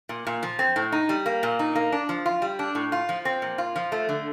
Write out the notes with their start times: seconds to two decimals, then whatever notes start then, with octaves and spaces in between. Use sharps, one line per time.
0.09 A#2
0.27 A#2
0.43 F3
0.59 C4
0.76 A2
0.92 D#4
1.09 G3
1.26 A#3
1.43 A#2
1.59 D#4
1.75 A#3
1.92 D4
2.09 F3
2.26 F4
2.42 G3
2.59 D4
2.75 A2
2.92 F4
3.09 F3
3.25 C4
3.42 A#2
3.58 F4
3.76 F3
3.92 A3
4.09 D3